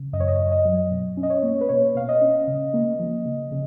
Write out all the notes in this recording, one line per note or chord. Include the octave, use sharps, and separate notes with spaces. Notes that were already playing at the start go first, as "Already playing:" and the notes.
Already playing: C#3
F#2 D#5
C#5
D#5
F#2
D#5
F#3
B2
C#4
D#5
C#5
A#3
B4
B2 C#5
B2 F5
D#5
C#4
C#3
A#3
F3
C#3
C#3